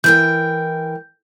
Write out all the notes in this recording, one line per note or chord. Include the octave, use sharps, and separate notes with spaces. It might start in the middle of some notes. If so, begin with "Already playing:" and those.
E3 A#4 G5 G6